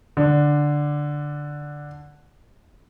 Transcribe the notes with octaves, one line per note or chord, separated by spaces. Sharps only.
D3 D4